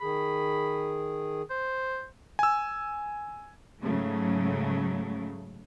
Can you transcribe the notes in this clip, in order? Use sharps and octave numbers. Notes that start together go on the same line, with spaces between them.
D#3 G#4 B5
C5
G#5 E6
G#2 C#3 F#3 A3